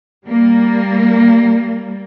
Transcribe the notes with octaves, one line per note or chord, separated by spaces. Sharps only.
G3 A#3